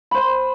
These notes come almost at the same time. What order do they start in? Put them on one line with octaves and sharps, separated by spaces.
B5 C5 C6